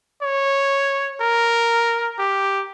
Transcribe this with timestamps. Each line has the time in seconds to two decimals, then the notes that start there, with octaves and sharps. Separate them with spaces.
0.23 C#5
1.21 A#4
2.19 G4